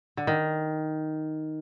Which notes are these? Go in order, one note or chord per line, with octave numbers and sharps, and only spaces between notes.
D3
D#3